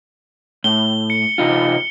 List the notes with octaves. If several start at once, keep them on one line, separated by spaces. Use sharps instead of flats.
A2 G7
C#7
C3 D#4 F4